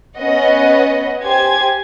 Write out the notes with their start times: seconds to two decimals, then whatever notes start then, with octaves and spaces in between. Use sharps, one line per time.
0.18 B3 C#4 B4 D#5 F#5
1.22 G4 C5 G#5 G#6